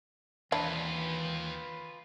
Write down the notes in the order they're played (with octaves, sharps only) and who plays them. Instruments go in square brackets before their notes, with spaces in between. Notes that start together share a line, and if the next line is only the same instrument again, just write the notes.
[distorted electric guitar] D#2 [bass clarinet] E3 [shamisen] D4 E4 [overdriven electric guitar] F4 B4